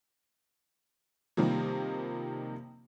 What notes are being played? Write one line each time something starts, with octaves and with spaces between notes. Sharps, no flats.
C3 D#3 F3 G3 A#3